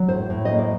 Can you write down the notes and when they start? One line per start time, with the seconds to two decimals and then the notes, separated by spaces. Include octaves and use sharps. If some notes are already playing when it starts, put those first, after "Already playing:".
Already playing: F#3
0.08 A2 C5
0.30 A2
0.45 D#5
0.51 A#3
0.59 D5